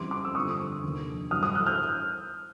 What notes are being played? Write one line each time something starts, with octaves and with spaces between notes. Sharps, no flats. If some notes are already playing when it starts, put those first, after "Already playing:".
Already playing: F2 C#3 E3 G3 C6 D6
C6 D6
E6
G1 F2 D3 F3 C#6 D#6
F1 D#2 D3
A1 G2 D3 F#3 D#6 F6
D#6 F6
E6 F#6
F6 G6